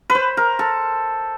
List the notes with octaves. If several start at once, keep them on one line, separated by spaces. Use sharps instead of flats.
B4
C5
A#4
A4